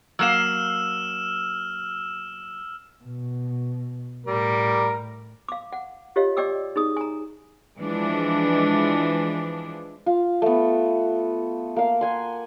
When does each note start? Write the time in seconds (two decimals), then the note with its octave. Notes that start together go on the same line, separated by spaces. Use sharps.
0.19 F#3 A#3 F5 E6 F6 E7
3.04 B2
4.26 A2 G3 A#4
5.48 F5 D6
5.73 F#5
6.16 F4 G4 C#5 D#5 F5
6.37 D5 D#5 G5 D6 E6
6.76 D#4 G#4 D#6
6.97 G#5 A#5
7.81 E3 F3 G#3 D4
10.06 F4
10.42 A3 B3
11.76 A#3 F5
12.01 F#5 G#5 C6